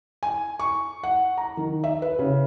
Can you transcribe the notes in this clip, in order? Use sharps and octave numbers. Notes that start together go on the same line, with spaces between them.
G#5
C#6
F#5
A#5
D#3
E5
B4
C#3